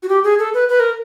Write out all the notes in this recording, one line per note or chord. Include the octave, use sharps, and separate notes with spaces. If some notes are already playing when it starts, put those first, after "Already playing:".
F#4
G4
G#4
A4
B4
B4
A#4